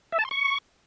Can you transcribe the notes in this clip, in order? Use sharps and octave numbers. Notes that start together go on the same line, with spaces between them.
E5
A5
C6
C#6